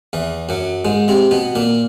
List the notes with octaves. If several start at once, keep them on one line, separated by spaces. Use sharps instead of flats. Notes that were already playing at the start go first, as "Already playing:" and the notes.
E2 E3
F#2 F#3
G#2 G#3
C3 C4
B2 B3
A#2 A#3